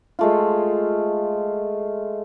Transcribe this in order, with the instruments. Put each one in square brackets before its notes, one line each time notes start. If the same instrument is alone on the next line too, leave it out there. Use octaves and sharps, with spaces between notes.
[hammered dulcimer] G#3 A3 F4